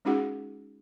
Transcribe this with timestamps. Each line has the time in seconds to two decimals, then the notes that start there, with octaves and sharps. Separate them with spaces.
0.05 G#3 C#4 D#4 F#4 G#4 F#5